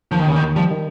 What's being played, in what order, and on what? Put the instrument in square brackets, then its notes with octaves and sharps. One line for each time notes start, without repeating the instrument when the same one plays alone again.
[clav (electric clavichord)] D#2 [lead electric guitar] F3
[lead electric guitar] D#3
[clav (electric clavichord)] D#2 [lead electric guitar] C#3
[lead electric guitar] D#3
[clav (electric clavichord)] D#2
[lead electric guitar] F3 [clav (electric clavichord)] G3
[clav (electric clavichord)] D#3